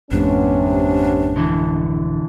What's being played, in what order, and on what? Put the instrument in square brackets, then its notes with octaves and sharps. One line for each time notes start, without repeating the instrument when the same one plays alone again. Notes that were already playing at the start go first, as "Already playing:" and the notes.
[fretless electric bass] G#1 F2 A3 [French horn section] C3 B3 C#4 [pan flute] D4
[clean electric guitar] B2 D3 E3